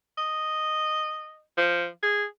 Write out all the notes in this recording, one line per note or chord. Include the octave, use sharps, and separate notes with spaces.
D#5
F3
G#4